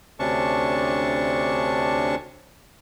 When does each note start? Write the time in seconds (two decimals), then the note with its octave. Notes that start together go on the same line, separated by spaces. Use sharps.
0.19 D2 C3 C#4 D4 A5 C#6